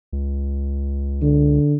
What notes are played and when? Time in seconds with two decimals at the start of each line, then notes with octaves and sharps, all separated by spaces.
0.13 C#2
1.22 D3